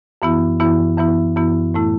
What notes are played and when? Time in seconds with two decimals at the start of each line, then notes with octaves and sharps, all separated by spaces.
0.22 F#2 E3 B3 E4
0.60 F#2 E3 B3 E4
0.98 F#2 E3 B3 E4
1.36 F#2 E3 B3 E4
1.74 A2 A3 E4